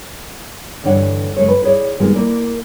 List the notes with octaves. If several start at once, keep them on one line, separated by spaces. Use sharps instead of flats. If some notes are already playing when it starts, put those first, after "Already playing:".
D2 G2 E3 D4 C#5 F#5
F#2 C#3 G#3 A3 C#5
B4
E4 G#4 A#4 C#5 D5
A#2 D#3 F3 G3 G#3 B3
A#3 E4 D5